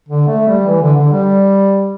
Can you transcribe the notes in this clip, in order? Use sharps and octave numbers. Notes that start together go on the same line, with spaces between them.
D3
A3
G3
E3
D3
D3
G3